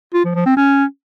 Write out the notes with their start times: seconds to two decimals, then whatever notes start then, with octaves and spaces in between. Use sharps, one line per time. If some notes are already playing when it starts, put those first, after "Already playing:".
0.14 F4
0.25 F3
0.36 F3
0.46 C4
0.57 C#4